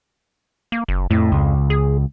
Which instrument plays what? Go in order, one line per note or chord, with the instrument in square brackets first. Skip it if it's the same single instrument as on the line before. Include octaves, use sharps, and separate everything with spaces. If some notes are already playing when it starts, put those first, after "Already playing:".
[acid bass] A#3
F#1
[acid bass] F2 [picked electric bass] A2
[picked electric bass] C#2
[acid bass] G#4